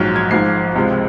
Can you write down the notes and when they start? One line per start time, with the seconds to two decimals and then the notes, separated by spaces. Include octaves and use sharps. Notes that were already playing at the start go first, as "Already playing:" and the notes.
Already playing: A#1 G#2 F#3 F6
0.16 G#6
0.31 G#1 G#2 F3 C7
0.75 C#2 C3 F3 G#3 C4